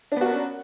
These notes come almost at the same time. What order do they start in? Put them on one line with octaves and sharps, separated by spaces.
D4 B3 F#4 A#4 C#4